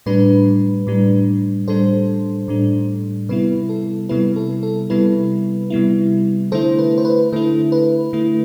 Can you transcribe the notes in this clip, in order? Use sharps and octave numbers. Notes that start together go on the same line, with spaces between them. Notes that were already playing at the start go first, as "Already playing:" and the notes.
A2 G3 D4 B4
A2 G3 D4
A2 G3 D4 A4 C5
A2 G3 D4
C3 G3 B3 E4 B4
A4
C3 G3 B3 E4 B4
A4
A4
C3 G3 B3 E4 B4
C3 G3 B3 E4
D3 A3 E4 A4 C5
B4
C5
B4
D3 A3 E4 A4
B4
D3 A3 E4